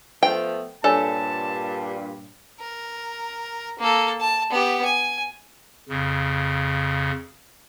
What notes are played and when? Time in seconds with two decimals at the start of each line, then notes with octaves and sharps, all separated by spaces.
0.23 F3 A3 B3 G5
0.84 G2 A#2 A4 C#5 D5 G#5 A5
2.61 A#4
3.79 A#3 A4
4.20 A5
4.50 B3 G4
4.85 G#5
5.89 F2 C#3